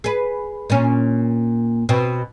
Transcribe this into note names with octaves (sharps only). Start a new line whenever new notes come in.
G#4 B4
A#2 C#4
B2 C4